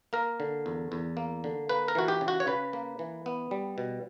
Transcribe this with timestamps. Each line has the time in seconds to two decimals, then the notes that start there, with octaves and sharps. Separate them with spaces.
0.13 A#3 A#4
0.40 D3
0.66 E2
0.92 E2
1.17 A#3
1.44 D3
1.69 A#3 B4
1.88 A#4
1.95 E3 F#4
2.08 G4
2.21 C#3
2.28 F#4
2.40 C#5
2.47 C#3 B4
2.73 A#3
2.99 E3
3.26 B3
3.51 G3
3.78 B2